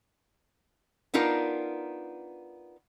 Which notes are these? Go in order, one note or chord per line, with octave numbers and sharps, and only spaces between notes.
B3 D4 D#4 F4 A#4